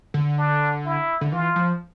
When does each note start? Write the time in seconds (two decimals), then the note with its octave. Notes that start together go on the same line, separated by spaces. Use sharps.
0.14 D3
0.38 D4
0.86 E4
1.21 D3
1.32 E3 F4
1.56 F3